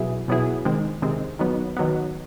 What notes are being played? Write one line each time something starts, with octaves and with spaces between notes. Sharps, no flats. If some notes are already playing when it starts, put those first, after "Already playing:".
Already playing: B2 F#3 B3 E4 G#4
B2 F#3 B3 E4 G#4
C3 D#3 G#3 C4
C3 D#3 G#3 C4
D#3 F#3 B3
D#3 F#3 B3